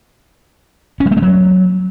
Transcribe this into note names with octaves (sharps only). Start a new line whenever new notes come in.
C#4
G3
A3
G#3
F#3